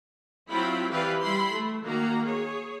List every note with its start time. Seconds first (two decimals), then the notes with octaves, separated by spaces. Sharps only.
0.50 F#3 C4 E4 F4 G5 B5
0.91 E3 G4 B4 D5 F5
1.21 G3 E4 B5 C6
1.52 A3
1.86 D#3 A#3 F#4 A#5
2.24 G#4 C#5